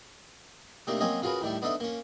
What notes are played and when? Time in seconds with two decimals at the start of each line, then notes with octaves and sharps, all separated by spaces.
0.87 C3 A3 A#3 D4 D#4
1.00 F#3 A#3 C4 C#4 C#5 D#5
1.22 C#3 F4 F#4 G#4 A#4 B4
1.41 A2 D#3 G3 A3
1.62 B3 D4 D#4 A4 D#5 E5
1.80 A#3 C#4